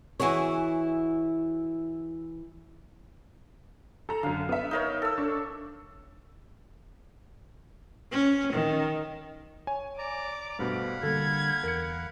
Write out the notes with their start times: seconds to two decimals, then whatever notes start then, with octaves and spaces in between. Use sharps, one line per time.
0.20 E3 E4 F#4 G#4 C#5
4.09 A4 A#5
4.23 F#2 D3 F5
4.49 B3 E5
4.71 D#4 A#4 C#5
5.02 A4 E6
5.18 D4 C#6
8.12 C#4
8.53 D#3
9.67 C#5 G#5
9.98 D5 A#5 D6
10.59 G2 B2 A3 C5 F5 F#5 B5
11.03 D3 G3 A#3 A4 G#6
11.64 E2 A#4 C#7